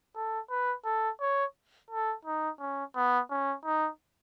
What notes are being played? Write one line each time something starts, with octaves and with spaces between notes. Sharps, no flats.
A4
B4
A4
C#5
A4
D#4
C#4
B3
C#4
D#4